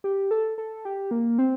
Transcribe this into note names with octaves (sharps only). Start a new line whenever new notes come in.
G4
A4
A4
G4
A#3
C4